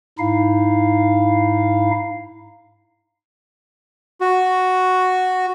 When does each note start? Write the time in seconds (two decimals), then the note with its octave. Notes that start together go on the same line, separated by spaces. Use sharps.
0.19 G#2 D#4 E4 F5
4.21 F#4